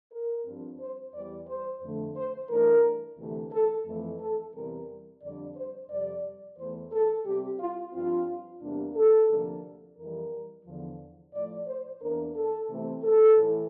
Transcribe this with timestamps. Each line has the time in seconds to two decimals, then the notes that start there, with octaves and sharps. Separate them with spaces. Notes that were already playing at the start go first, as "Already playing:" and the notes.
0.12 A#4
0.46 G2 F3 C4
0.80 C5
1.14 E2 E3 G3 D5
1.47 C5
1.82 F2 D3 A3
2.16 C5
2.49 G2 E3 A3 D4 A#4
3.18 D2 C3 E3 A3
3.52 A4
3.86 F2 E3 A3
4.20 A4
4.54 E2 C3 E3 G3 C4 A#4
5.22 F2 D3 G3 D4 D5
5.56 C5
5.90 F2 C3 G3 D5
6.57 E2 E3 A3 C5
6.92 A4
7.25 C3 G3 C4 G4
7.60 F4
7.93 G2 F3 C4 F4
8.61 E2 C3 G3 A#3 D4
8.96 A4
9.30 D2 C3 F3 A#3 D4
9.97 F2 E3 G3 A#4
10.65 E2 D3 F3
11.33 A2 F3 A3 D5
11.67 C5
12.01 E2 E3 A#3 D4 A#4
12.36 A4
12.69 C3 E3 A3 C4
13.04 A4
13.37 A2 E3